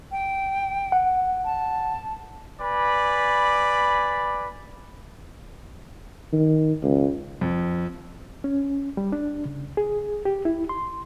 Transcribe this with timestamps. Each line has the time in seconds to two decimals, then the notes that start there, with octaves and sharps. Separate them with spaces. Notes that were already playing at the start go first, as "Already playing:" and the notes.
0.12 G5
0.92 F#5
1.45 A5
2.61 B4 D5 G#5 B5
6.33 D#3
6.82 C#2
7.41 F2
8.44 C#4
8.97 G3
9.12 D4
9.45 C#3
9.77 G#4
10.25 G4
10.45 E4
10.69 C6